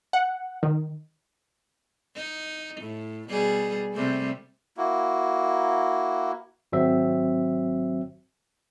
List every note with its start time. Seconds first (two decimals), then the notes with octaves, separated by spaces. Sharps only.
0.13 F#5
0.63 D#3
2.16 D#4
2.81 A2
3.29 B2 G3 G#4
3.93 C3 G3 A3
4.77 A#3 E4 F#4
6.72 G#1 F#3 C4 E5